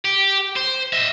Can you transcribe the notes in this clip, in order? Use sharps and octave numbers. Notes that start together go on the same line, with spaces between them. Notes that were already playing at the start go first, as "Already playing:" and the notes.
G4
C5
D#5 E5